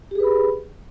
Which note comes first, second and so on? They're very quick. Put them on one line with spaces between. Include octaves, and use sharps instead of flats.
G4 G#4 B4 B5